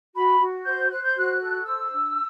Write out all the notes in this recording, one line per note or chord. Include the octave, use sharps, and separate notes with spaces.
F#4 B5
F#4
C5 G6
C5 F#6
G6
F#4 F#6
A4
C5 E6
D4